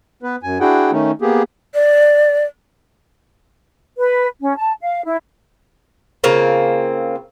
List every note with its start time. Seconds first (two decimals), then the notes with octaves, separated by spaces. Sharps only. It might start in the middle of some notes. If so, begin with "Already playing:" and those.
0.23 B3 B4
0.43 F#2 G#5
0.60 D4 E4 F#4 G#4 F#5 G5
0.92 D#3 A3 C#4 D#4
1.22 A#3 B3 G4 G#4
1.74 D5
3.97 B4
4.40 C#4
4.57 A5
4.81 F5
5.05 E4
6.24 C#3 A#3 C4 F4